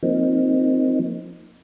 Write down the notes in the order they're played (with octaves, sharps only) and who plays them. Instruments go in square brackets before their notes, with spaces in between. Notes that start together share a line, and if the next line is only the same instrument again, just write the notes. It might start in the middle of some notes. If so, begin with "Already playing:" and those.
[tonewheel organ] F3 A#3 C4 D#4